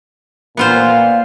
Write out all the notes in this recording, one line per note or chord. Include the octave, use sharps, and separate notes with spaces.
A#2 A#3 B3 F4 C5 F5